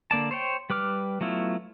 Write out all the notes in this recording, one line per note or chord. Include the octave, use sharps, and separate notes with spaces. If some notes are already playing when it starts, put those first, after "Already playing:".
D3 A#3 D5 A5
C5 C#5 G5
G3 B4 D6 F6
F#3 A3 B3 E4 F4